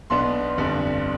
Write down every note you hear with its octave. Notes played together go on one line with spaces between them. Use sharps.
B1 B2 B3 D4 C6
G1 F2 D3 G3